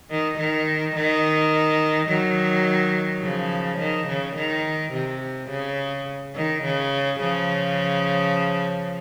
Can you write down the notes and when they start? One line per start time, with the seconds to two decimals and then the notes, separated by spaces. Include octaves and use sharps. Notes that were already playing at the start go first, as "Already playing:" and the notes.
0.10 D#3
0.39 D#3
0.95 D#3
2.09 D#3 F#3
3.23 C#3 F3
3.79 D#3
4.08 C#3
4.36 D#3
4.93 C3
5.50 C#3
6.35 D#3
6.64 C#3
7.20 C#3 F3